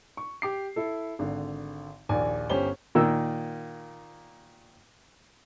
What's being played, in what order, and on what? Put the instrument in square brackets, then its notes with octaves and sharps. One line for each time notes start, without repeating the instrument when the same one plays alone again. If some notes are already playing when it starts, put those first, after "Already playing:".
[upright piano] C#6
G4 D6 C7
E4 A4
G#1 D3
A#1 D#2 D5 G#5
G1 C#4 G4 C5 G7
[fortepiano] A#2 D#3 E6